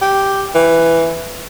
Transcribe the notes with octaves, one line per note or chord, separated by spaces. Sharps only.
G4
E3